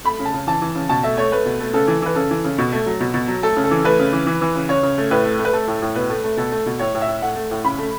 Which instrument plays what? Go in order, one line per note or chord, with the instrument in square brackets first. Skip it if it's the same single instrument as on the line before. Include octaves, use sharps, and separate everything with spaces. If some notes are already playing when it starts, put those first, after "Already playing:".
[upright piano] A3 B5
C#3
A5
C#3
E3 A5
E3
C#3
B2 A5
A3 E5
A3 C#5
A3 B4
B2
A3
C#3 A4
E3
E3 B4
C#3 A4
E3
C#3
B2
A3
F#3
B2
B2
F#3
A3 A4
C#3
A4
E3
A3 B4
C#3
E3
E3
E3
C#3
C#3 C#5
C#3
A3
A2 B4
A3
A3
B4
A3 A4
A2
A2
B2 B4
A3
A3
B2 A4
A3
B2
A2 C#5
A2
E5
A2
A3 F#5
A3
A2
C#3 B5
A3